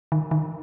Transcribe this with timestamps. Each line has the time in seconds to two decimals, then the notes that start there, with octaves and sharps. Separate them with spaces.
0.12 D#3
0.31 D#3